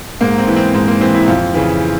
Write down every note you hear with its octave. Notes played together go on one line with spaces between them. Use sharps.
G#2 A#3
C4
E3
C4
G#2 C4
A#3
E3 C4
E4
F2 F4
C#3 E3